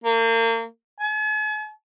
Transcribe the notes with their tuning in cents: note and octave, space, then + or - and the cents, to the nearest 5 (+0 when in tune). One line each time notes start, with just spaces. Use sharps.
A#3 -35
G#5 +45